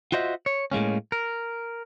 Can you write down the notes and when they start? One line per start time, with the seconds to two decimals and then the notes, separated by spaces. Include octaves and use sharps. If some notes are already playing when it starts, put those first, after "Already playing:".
0.12 F4 F#4 C5 D#5 E5
0.46 C#5
0.72 A2 G#3 A#3 C#4
1.12 A#4